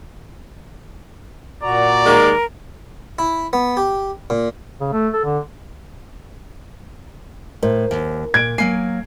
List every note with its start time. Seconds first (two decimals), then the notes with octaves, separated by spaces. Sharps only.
1.63 A#2 F#4 D5 A#5
2.06 D#2 G#3 A#3 A#4
3.19 E4
3.53 B3
3.77 G4
4.30 A#2
4.81 C#3
4.92 A3
5.13 A4
5.25 D3
7.63 A2 A#4 C5
7.91 D#2
8.34 A#2 G#6 D7
8.58 F#3 A#3 G#5 C7